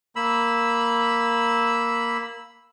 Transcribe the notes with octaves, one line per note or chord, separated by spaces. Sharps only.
A#3 B5 E6